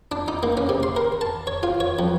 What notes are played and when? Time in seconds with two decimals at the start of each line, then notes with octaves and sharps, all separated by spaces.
0.12 D4
0.28 D#4
0.43 A#3
0.57 C#4
0.69 C3
0.83 C6
0.96 A#4
1.21 A5
1.47 C#5
1.63 F4
1.80 C#5
1.99 F2